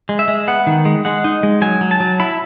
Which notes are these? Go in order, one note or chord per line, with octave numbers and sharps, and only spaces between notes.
G#3
E5
G#3
B3 F#5
D#3
G#3
G#3 F#5
D#4
G#3
F#3 G#5
F#3
A5
F#3
E4 B5